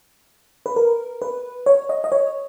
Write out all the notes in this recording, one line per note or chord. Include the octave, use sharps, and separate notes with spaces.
B4
A#4
B4
C#5
D#5
D#5
C#5